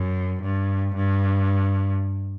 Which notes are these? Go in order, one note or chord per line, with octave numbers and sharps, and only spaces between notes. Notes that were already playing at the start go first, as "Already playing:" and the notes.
Already playing: F#2
G2
G2